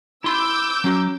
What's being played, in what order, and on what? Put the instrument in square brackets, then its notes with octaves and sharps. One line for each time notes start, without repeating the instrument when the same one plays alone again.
[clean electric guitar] E4 C6 [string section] D6 E6 G6
[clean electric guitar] F#3 [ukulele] C#4 F#4